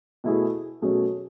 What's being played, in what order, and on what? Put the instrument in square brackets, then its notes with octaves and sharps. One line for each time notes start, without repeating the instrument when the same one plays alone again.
[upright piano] B2 A3 E4 G#4
B2 F#3 A3 C#4 G#4